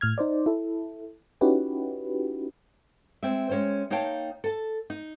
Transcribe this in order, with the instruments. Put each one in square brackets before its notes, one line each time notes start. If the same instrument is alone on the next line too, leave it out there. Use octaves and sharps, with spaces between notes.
[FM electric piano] A2 F6 G#6
D#4 C5 D5
E4 A4
C#4 D#4 E4 F#4 G4 B4
[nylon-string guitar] G#3 C4 C5 E5
G#3 C#4 C5
A#3 D#4 C#5 F5 G5 A5
A4 A5
D#4